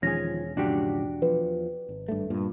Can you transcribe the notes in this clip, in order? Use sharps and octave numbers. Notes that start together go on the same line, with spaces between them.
E1 D#3 F3 C#4 G#4 A#6
G#2 C#3 F3 D4 F#4 G4
E2 F3 B4
G#1
G2 A3
G2 A#2